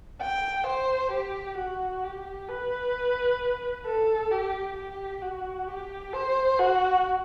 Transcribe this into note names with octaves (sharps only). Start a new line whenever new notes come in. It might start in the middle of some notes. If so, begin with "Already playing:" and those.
G5
C5
G4
F#4
G4
B4
A4
G4
G4
F#4
G4
C5
F#4